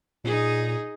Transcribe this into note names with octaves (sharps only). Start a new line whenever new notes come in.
A#2 D#4 G#4